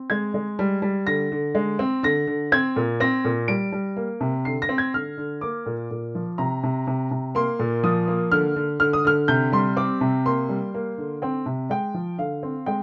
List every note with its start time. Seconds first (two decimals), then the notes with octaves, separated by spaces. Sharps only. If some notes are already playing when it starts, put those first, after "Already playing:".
Already playing: C4
0.10 G#3 G#6
0.34 G#3
0.59 G3
0.82 G3
1.07 D3 A#6
1.32 D3
1.55 G#3
1.79 C4
2.03 D3 A#6
2.27 D3
2.52 C4 G#6
2.76 A#2
3.00 C4 A#6
3.25 A#2
3.48 G3 D7
3.72 G3
3.96 A#3
4.21 C3
4.45 D3 C7
4.62 A#6
4.69 C4
4.78 G#6
4.94 D3 F6
5.17 D3
5.41 A#3 D6
5.66 A#2
5.91 A#2
6.15 F3
6.38 C3 A#5
6.63 C3
6.87 C3
7.11 C3
7.35 A#3 C6
7.59 A#2
7.84 F3 D#6
8.08 A#3
8.32 D3 F6
8.56 D3
8.80 D3 F6
8.93 D#6
9.05 D3 F6
9.28 C3 G6
9.52 G3 C6
9.77 C4 D6
10.01 C3
10.26 A#3 C6
10.49 G3
10.74 A#3
10.98 D3
11.22 C4 G5
11.46 C3
11.70 G#3 G5
11.94 F3
12.18 D3 F5
12.43 C4
12.66 G#3 G5